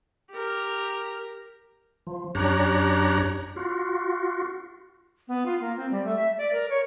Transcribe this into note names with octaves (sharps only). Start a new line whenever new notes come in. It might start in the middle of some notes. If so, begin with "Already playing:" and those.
G4 A#4
F3
F#2 D4 G4 C#5 A#5 F#6
F4 F#4
B3
F4
A#3
C4
G3
A3
E5
D5
A#4
C#5